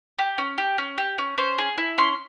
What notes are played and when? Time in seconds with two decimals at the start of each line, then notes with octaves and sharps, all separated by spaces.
0.19 G4
0.38 C#4
0.58 G4
0.78 C#4
0.98 G4
1.18 C#4
1.38 C#4 C5
1.58 G#4
1.78 E4
1.98 C#4 C6